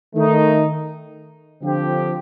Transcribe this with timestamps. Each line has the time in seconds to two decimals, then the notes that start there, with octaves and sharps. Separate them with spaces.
0.15 D#3 A3 D#4
1.61 D3 F3 C4 G4